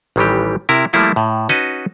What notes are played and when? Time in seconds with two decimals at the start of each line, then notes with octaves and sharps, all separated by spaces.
0.16 A1 D#3 E3 G3 G4
0.69 C3 E4 A#4
0.93 F3 G3 A3 A#3 E4 F4
1.16 A2
1.49 C#4 D#4 F#4 B4 D#5 A5